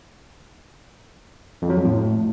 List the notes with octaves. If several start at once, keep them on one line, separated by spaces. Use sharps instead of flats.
F2
F#3
F2
A2